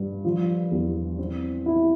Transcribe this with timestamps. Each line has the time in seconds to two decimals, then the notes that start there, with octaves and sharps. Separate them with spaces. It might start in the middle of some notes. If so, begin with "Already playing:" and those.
Already playing: G2
0.24 F3
0.71 E2
1.19 C4
1.66 E4